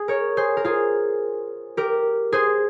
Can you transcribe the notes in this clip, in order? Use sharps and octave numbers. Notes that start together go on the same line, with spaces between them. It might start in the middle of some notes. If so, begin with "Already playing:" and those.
Already playing: G#4
A#4 C#5
G#4 C5
A#4
F4 G#4
G4 A#4
G#4 C5